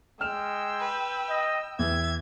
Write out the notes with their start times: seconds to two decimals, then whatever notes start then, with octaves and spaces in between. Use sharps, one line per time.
0.21 G#3 G5 E6 F6 E7
0.80 B4
1.29 D#5
1.79 E2 E5 G#6